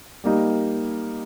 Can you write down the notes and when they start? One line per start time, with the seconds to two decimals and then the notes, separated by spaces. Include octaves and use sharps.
0.24 G3 A#3 D#4 G4